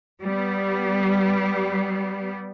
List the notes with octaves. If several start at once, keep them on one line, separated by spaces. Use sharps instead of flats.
G3 B3